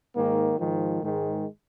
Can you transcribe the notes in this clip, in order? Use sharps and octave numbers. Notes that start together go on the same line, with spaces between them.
G#2 D#3 A#3
G#2 D#3 F3
G#2 D#3 G#3